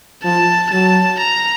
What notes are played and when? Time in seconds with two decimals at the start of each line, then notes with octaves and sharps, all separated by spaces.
0.24 F3 A5
0.71 F#3 A5
1.19 A#5